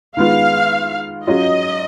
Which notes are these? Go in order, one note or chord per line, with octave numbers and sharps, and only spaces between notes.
D#3 G#3 B3 F4 F5
F#3 C#4 F4 D#5